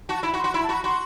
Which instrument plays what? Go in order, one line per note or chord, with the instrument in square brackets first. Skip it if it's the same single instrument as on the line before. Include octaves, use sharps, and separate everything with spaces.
[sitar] F#4 [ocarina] A5
[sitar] E4 [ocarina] B5
[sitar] F#4
[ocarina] C6
[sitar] F#4
[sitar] E4 [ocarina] B5
[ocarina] A5
[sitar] F#4 [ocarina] B5
[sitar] F#4 [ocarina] C6